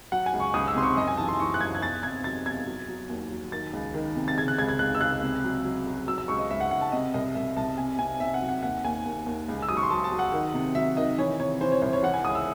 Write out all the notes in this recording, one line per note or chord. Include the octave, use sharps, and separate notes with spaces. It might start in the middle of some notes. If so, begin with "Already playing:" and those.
F#3 F#5
G#5
C#2
C#6
C#2 D#6
E6
C3 C6
C#6
F#2 D#5
G#5
E3 A5
C6
E3 C#6
F#6
F#2 G#6
G#6
E2 A6
C3 G#6
F#3 A6
E2 G#6
F#3
F#3
D#2
F#3
D#3 A6
C#2
D#3
C3
A6
C#3 G#6
F#6
C#2 G#6
G#6
C#2 F#6
E6
C#2 F#6
C3
F#3
F#3
F#3
F#3 E6
E6
C#2 C#6
D#5
C#2 E5
F#5
C#2 F#5
A5
C3 D#5
C2 D#5
C2 E5
C2 A5
C3 G#5
C3 G#5
C3 E5
F#5
F#3
F#5
D#2 F#5
D#2 G#5
D#2
D#2
C#2
E6
F#3 D#6
C#6
C6
F#3 A5
A5
F#3
F#5
D#3
C3
F#3 E5
D#3 D#5
E3 C#5
C3 C#5
E3 C5
C#5
C2 C5
C#5
E3 F#5
G#5
C#2 D#6
E6